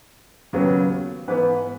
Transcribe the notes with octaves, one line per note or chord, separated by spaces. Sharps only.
D#2 C#3 F#3 B3
G#2 E3 B3 B4